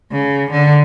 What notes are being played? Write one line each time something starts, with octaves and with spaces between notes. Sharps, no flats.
C#3
D3